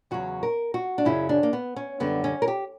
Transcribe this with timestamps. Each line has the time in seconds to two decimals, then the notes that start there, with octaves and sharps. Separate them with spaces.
0.11 E2 C#3 F#3 F#4
0.43 A#4
0.74 F#4
0.98 D4
1.05 F#2 C#3 F#3 E4
1.29 D4
1.43 A#3
1.53 B3
1.76 C#4
2.00 F#2 D3 G3 B3
2.24 C#4
2.42 A#4
2.48 G4